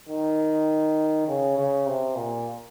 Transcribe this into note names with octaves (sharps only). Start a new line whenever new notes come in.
D#3
C#3
C#3
C3
A#2